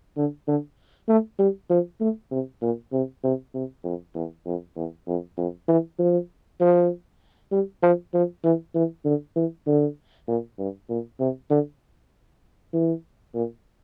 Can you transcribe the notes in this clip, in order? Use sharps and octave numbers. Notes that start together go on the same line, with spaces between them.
D3
D3
A3
G3
F3
A3
C3
A#2
C3
C3
C3
F2
E2
F2
E2
F2
F2
E3
F3
F3
G3
F3
F3
E3
E3
D3
E3
D3
A#2
G2
A#2
C3
D3
E3
A#2